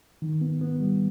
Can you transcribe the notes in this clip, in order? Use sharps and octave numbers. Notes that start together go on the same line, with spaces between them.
D#3
B3
B3
G3